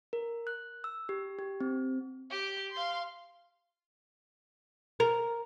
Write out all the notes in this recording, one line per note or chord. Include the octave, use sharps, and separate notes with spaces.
A#4
F#6
E6
G4
G4
C4
G4 D6
F5 C6
A#4